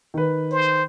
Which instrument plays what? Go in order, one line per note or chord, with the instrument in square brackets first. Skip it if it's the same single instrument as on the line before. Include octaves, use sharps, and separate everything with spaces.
[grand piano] D#3 B4
[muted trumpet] C5